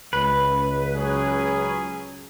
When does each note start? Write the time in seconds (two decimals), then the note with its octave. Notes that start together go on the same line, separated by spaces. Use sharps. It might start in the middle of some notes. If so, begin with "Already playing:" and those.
0.13 C#2 B4
0.94 F#3 C#4 G#4